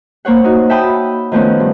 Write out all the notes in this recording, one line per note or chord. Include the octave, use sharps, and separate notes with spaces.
A#3 C5 C#5 F#5
A#3 D#4 F#4
E5 G5 A5 B5 D#6
D#3 F3 A3 B3 C#4
G2